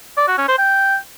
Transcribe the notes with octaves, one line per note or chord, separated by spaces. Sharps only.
D5
F#4
C#4
C5
G5